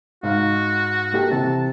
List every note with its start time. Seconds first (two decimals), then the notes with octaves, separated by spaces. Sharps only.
0.23 G#2 F#4 F5
1.12 A#3 G4 A4
1.31 C3 E3 A5